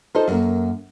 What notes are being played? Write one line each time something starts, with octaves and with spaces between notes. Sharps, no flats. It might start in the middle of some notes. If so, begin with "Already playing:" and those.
D#4 F4 A4 C5 D#5
F#2 A#3